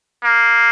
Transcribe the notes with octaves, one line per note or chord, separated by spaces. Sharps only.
A#3